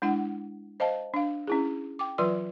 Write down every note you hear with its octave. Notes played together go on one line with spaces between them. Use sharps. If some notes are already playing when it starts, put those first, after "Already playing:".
G#3 D4 E4 F#5
C5 D#5 F5 A5
D4 F5
C#4 E4 G#4
G5 D6
E3 F#3 F4 B4 D5 C6